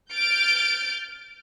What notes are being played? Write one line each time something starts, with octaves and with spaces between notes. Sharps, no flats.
F6 G6 A6 D7